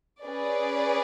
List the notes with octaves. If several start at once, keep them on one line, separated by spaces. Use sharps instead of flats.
C#4 G#4 B4 D5